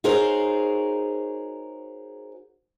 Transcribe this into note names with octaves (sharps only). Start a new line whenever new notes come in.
D#4 F#4 G#4 A#4 C5 C#5